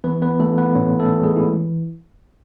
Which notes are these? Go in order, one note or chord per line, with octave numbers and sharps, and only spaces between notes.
E3 B3 B4
B3 B4
E3 A3 A4
B3 B4
A2 C#4 C#5
A3 A4
E3
G#3 G#4
E4